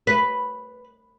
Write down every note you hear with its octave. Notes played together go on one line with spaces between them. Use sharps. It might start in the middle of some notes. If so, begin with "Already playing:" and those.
B4